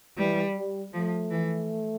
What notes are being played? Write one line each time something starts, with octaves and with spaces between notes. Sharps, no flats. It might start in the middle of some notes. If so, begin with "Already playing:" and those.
E3 G3
G3
F3 A3
E3